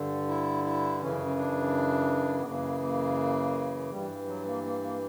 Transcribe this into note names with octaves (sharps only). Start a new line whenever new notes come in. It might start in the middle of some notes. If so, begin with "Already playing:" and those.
Already playing: G2 D3
E4
E4
F#2 C#3 E3 C#4
C#4
D4
B3
F#2 C#3 E3 A#3
A#3
G2 E3 G3
F#3
A#3
A#3
A#3